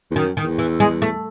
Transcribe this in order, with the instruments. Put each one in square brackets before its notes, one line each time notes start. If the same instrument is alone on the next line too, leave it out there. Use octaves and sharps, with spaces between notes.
[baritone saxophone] E2
[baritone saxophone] F#2 [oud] D#3
[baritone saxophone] E2 [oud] D#3
[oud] E3
G#3
A3